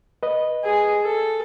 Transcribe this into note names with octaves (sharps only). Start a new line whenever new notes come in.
B4 D#5
G#4
A4